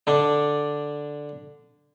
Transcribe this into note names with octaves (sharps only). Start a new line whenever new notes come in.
D3 D4